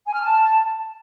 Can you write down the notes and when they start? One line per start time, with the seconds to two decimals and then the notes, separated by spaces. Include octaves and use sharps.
0.07 G#5
0.14 F6
0.21 A5